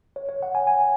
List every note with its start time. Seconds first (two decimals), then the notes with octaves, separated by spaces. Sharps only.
0.16 C#5
0.29 C#5
0.43 F#5
0.55 G#5
0.67 G#5